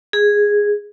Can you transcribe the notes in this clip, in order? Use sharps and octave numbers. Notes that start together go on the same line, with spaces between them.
G#4